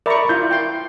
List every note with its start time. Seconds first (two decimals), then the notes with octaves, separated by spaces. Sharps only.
0.06 A#4 D5 E5 A#5 B5 C#6
0.29 E4 F4 G6
0.51 G5 C6